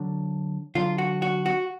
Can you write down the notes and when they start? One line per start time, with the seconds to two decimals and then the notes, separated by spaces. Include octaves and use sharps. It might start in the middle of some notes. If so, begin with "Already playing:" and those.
Already playing: D3 F#3 D4
0.75 D3 F#3 D4 F4
0.98 F#4
1.22 F#4
1.46 F#4